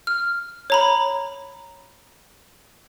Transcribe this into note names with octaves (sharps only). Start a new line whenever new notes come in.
F6
C#5 A#5 B5